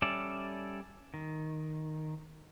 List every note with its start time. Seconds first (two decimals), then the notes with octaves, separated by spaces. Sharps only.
0.02 G3 C#4 A4 D5 E5
1.14 D#3